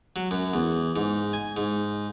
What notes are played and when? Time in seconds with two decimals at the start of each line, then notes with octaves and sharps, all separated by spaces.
0.16 F#3
0.31 F#2
0.54 E2
0.96 G#2
1.33 G#5
1.57 G#2